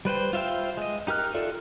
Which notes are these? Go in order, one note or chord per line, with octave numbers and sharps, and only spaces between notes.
G3 B4 C5 G5
F4 C5 E5 F5 G5
G#3 D#5
D#4 G4 A#4 F6 F#6
F4 A4 D5 E5